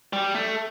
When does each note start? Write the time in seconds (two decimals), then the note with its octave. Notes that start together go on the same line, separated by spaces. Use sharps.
0.13 G3
0.35 A3